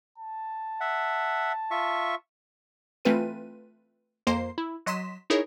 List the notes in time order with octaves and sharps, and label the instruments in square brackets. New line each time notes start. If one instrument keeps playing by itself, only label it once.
[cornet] A5
[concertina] E5 F#5
F4 E5 C#6
[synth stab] E3 A3 C4 F4 B4 D#7
F2 A#3 C5 C6 C7
E4
F#3 D#5 C6 B6 E7
D#4 E4 G#4 A#4 C#5